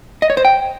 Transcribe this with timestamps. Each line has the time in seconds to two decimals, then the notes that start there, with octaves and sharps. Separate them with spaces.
0.22 D#5
0.30 C#5
0.37 C5
0.45 G5